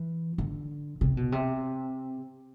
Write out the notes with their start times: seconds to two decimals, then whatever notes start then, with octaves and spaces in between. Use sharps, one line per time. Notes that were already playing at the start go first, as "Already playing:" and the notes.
Already playing: E3
0.38 D3
1.01 C3
1.17 B2
1.32 C3